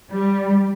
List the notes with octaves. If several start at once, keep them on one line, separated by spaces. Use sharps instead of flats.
G3